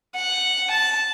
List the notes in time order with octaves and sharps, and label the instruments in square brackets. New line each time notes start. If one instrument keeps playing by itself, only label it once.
[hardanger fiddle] F#5
A5